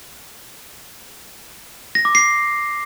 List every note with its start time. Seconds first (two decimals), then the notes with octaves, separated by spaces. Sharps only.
1.95 A#6
2.05 D6
2.15 C7